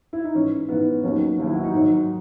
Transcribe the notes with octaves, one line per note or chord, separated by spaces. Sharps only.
E4
D#4
G#2 E3 C#4
G#2 E3 B3
D#2 D#3 F#3 C#4
D#2 D#3 F#3 D#4
E4
F#4
D#4
G#2 D#3 F#3